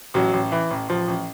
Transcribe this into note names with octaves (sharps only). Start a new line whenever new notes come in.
A1 F#3
A1
E3
A1
A1 F3
A1